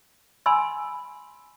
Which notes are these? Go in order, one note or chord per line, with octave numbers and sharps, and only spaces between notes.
G#5 B5 C6 E6